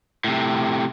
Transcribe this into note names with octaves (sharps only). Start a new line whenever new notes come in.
A2 C3